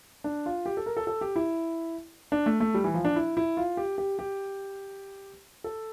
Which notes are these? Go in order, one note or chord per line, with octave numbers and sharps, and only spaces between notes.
D4
F4
G4
A4
A#4
A4
A4
G4
E4
D4
A3
A3
G3
E3
F3
D4
E4
E4
F4
G4
G4
G4
A4